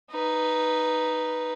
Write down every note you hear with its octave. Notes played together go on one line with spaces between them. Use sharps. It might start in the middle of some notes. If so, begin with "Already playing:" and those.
D#4 B4